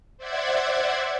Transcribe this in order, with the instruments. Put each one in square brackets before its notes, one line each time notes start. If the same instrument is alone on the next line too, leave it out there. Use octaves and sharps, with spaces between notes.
[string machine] C5 D5 E5 F#5 G#6